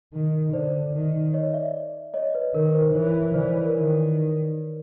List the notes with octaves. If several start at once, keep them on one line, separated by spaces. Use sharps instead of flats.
D#3
D3 C5 D5
D#3
C#5 D#5
D5 E5
C#5 D#5
B4
D#3 A#4
C5
E3 C#5
E3 C5 D5
C#5
B4
A#4
D#3 C5